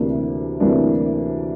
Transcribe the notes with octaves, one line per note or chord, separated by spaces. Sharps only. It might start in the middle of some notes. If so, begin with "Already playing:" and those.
Already playing: D2 C3 E3 A#3 D4
D2 C3 E3 A#3 D4